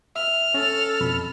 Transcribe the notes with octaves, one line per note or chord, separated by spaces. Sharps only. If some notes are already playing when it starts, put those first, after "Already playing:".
E5 F6
C#4 A4
F2 B2 B5